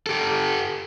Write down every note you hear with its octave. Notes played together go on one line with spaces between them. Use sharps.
G4 A4